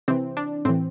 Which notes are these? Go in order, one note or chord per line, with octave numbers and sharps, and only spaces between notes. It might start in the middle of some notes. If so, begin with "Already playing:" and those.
C3 E3 C4
D4
A2 E3 C4